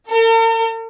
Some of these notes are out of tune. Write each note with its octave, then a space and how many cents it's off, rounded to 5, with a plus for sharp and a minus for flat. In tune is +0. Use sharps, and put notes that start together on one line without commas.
A#4 -45